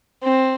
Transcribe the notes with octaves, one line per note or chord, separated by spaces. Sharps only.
C4